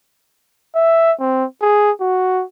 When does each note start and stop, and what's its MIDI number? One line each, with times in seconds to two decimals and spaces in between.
0.76 1.13 76
1.20 1.45 60
1.62 1.91 68
2.01 2.43 66